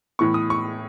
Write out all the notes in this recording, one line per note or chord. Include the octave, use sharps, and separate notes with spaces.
A2 E3 B3 C#6
D#6
C#6